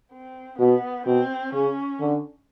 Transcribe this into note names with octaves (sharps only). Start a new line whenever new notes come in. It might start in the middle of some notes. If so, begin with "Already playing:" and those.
C4
B2 B3
B2 C4
C#3 C#4
D3